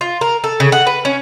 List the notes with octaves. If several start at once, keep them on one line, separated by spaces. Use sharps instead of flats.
F4
A#4
A4
C#3
F#5
B4
C#4